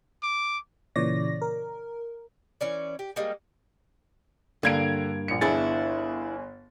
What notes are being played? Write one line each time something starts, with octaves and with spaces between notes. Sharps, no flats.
D6
A#2 C#3 E3 C#5 D5 A#6
A#4
E3 C#4 D5
G4
G3 G#3 A#3
G2 D3 A#3 G#6 D7
A#1 C#7
G1 B3 D4 E4 G#4 A6